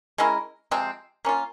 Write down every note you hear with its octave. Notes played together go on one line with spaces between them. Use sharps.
G#3 C#4 E4 A#4
C3 F3 G#3 C4
A#3 C#4 F4